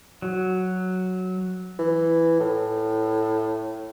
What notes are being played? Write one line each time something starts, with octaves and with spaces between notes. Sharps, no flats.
F#3
E3
A2